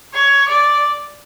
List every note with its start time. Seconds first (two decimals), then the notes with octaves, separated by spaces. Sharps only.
0.14 C#5
0.48 D5